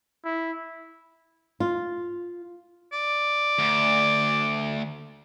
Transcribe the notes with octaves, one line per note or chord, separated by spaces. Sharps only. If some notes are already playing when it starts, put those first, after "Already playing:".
E4
F4
D5
D2